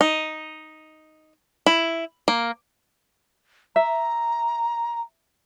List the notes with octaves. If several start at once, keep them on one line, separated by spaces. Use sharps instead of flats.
D#4
E4
A#3
E5 A#5